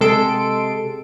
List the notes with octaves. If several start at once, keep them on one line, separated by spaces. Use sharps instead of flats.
C3 G#3 A4 C6 D7